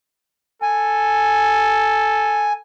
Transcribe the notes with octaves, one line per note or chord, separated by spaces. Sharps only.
A4 G#5